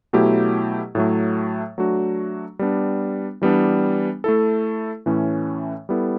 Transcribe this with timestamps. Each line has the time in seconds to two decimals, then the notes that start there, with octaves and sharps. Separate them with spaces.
0.13 B2 F#3 A3 E4 G4
0.95 A2 F#3 A3
1.78 F#3 A3 D4 F#4
2.59 G3 B3 D4
3.41 E3 G3 B3 D4
4.24 A3 E4 A4
5.06 A2 E3 A3 C#4
5.89 G3 B3 E4 A4